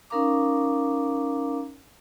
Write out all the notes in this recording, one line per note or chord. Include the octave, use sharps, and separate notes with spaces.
C#4 D#4 A#4 F5 A#5 D6